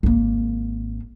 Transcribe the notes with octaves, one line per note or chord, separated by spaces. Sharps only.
G#1 A#3